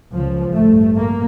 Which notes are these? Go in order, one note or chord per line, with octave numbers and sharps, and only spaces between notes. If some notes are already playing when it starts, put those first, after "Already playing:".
C#2 C#3 F3
A1 G2 A3
A#3